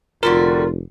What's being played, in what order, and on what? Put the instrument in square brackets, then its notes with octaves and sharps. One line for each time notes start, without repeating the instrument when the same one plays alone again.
[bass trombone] F1 [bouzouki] D3 G3 F#4 [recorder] F4 [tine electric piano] A#4